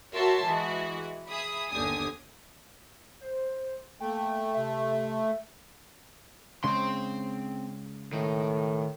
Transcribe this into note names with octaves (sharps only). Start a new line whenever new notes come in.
F#4 A#4 C#5 E5 A5 C6
E3 G#3 F#4
G#4 E5 B5 D#6
G1 D#2 D3 G4 G#5 D#6
C5
A3 A#3 G5
C3 E5
C#3 G#3 C4 C6
A2 D#3